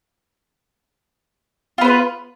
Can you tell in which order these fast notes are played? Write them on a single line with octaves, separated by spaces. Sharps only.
F4 B3 C5 B4